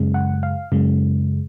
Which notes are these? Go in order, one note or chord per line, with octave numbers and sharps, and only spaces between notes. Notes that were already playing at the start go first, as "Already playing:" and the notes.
Already playing: F#2 C#3 G#3
F#5
F5
F#2 C#3 G#3